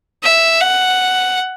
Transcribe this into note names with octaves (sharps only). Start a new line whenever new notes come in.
E5
F#5